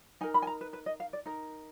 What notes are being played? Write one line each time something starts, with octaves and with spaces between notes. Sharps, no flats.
D#4 A#4 G#5
B5
G#5
A#5
B4
B4
D#5
F5
D5
D#4 A#4